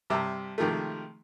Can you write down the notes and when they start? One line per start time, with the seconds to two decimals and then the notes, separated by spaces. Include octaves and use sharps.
0.10 G2 C3 E5 A5 A#5 E6
0.58 C3 D#3 F3 G#3 A3